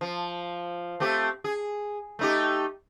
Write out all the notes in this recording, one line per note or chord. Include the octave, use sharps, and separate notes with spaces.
F3
A3 C4 G4
G#4
A3 D#4 G4